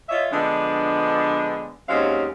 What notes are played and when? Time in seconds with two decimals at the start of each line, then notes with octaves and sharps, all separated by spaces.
0.09 F4 C#5 D#5 E5
0.32 D3 F3 G#3 B3 D4
1.89 D#2 F#3 G#3 C4 C#4 F5